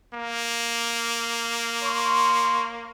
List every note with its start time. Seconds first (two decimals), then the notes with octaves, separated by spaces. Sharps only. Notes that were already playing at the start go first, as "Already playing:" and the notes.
0.14 A#3
1.82 C#5 C6 C#6